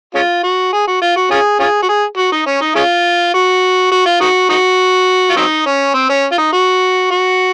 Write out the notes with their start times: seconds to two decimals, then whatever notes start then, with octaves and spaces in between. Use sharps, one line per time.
0.15 G#3 C#4 F4
0.43 F#4
0.73 G#4
0.87 F#4
1.02 F4
1.16 F#4
1.31 C#4 F4 G#4
1.59 C#4 F4 G#4
1.82 F#4
1.89 G#4
2.17 F#4
2.32 D#4
2.46 C#4
2.61 D#4
2.76 G#3 C#4 F4
3.34 F#4
3.92 F#4
4.06 F4
4.21 D#4 F#4
4.49 D#4 F#4
5.30 F4
5.36 F#3 C4 D#4
5.66 C#4
5.94 C4
6.09 C#4
6.32 F4
6.38 D#4
6.53 F#4
7.11 F#4